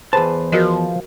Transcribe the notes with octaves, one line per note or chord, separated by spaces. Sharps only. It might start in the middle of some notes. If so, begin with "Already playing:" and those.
E2 G#4 B4 C5 A5
F3 F#4 A#4 D#5